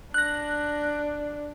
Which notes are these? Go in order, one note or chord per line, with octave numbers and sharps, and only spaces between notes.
D4 F#6 A#6